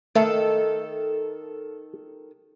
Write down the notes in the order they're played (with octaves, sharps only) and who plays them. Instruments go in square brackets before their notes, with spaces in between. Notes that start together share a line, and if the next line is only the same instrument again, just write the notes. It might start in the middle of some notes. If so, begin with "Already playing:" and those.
[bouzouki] D#3 A4 [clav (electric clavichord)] A3